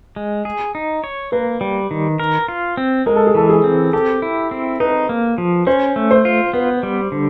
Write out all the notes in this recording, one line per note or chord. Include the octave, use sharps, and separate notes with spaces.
G#3
G#4
D#4
C#5
A#3 B4
G3
D#3
A#4
F4
C4
G#3 A#4
A4
G#4
E3 A4
G#4
C4
G4 A4
E4
C4
D#4 B4
A#3
F3
C#4 C5
A3
C5
F4
B3 B4
G3
D3